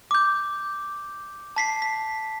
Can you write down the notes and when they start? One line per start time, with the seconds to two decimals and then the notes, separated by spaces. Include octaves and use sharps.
0.11 D6 G6
1.56 A5 B6 C7
1.82 B6